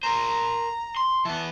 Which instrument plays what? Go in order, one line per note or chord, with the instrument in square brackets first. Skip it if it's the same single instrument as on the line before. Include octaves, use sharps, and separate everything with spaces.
[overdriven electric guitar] A#4 C5 [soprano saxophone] A#5
[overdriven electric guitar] C6
[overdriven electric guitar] E3 B3 [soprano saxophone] A5